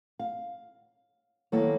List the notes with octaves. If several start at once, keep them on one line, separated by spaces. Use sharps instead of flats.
F5
D#3 F#3 A#3 B3 E4 A4